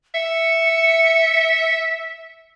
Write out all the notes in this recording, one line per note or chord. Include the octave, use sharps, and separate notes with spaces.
E5 C#7